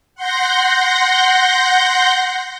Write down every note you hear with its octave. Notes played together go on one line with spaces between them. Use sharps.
F#5 C6 G6 A#6